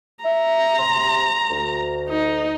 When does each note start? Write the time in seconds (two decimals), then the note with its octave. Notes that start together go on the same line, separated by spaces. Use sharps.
0.24 E5 A#5
0.79 C3 C6
1.50 D2
2.09 D#4